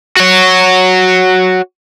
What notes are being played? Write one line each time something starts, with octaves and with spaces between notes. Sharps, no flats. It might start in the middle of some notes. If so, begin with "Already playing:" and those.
F#4 C#5